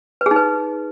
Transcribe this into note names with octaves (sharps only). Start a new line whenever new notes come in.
B4
G#4
D#4
B4